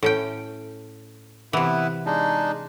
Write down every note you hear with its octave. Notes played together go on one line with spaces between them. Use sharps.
A2 C#4 G5
C3 E3 B3 E4 B4
G#3 D4 D#4